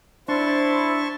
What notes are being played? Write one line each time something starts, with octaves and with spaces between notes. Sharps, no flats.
D4 E4 C5 A5 C6 C#6